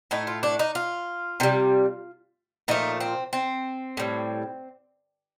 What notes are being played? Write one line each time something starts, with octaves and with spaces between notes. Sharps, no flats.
A2 A3 D#4
F4
D4
D#4
F4
C3 D#3 G3
A#2 F3 A3 D#4
C4
C4
A2 G3